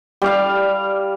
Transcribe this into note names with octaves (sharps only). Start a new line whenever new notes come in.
G3 D5 F5